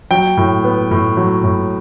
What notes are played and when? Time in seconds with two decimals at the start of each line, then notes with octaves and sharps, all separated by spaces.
0.11 F#3 G5
0.37 A2
0.64 B3
0.91 A2
1.17 F#3
1.44 A2